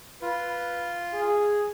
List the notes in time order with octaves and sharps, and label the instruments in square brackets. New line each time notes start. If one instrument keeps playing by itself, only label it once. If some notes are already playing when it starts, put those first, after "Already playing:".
[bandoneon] F4 [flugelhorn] B4
[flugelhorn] G#4